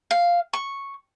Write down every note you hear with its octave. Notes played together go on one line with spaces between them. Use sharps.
F5
C#6